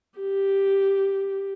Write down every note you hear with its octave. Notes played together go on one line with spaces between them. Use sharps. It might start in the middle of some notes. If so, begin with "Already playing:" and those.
G4